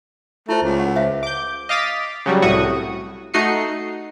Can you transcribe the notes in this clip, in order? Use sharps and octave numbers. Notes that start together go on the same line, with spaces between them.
A3 E4 F4 C5
C#2
F#5
C5 E5 F5
D6 G6
D#5 F5 D6 A6 B6
C#3 F#3 G3
C2 A2 F#4 C#6 D#6
A3 D#4 F#4 D#5 C7 C#7